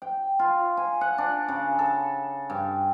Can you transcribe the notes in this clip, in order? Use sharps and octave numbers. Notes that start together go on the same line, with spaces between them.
G5
F4
G#5
F#5
D4
C#3
A4
G2